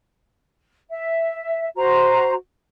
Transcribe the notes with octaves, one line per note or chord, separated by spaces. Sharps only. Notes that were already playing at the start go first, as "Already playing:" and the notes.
E5
F#4 C5 A#5